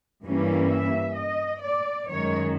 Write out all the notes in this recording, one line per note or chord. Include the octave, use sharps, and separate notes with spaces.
G2 E3 G3 A#3 C#4
E5
D#5
D5
F#2 D#3 G#3 C#5